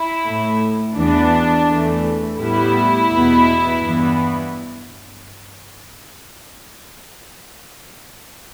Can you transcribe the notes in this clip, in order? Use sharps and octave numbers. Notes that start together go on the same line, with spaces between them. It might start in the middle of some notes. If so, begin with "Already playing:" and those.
Already playing: E4
A2 A3
E2 E3 B3 D4
E2 E3 A3
A2 G3 B3 E4
E2 B2 B3
G2 E3 B3